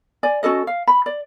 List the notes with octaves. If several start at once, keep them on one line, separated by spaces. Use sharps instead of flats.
D5 G#5
C#4 F#4 A4 D#5
F5
B5
D5